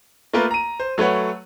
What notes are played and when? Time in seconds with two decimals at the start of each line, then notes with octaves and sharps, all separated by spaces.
0.34 A3 A#3 F4 A#4 B4
0.51 A#5 D#7
0.80 C5
0.98 F#3 A3 B4 C#5 F#5